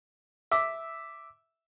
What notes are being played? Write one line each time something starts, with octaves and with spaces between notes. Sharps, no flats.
E5 D6 E6